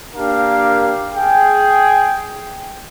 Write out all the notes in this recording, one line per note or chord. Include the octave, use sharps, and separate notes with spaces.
A#3 D4 G4 A#4 F5
G#4 G5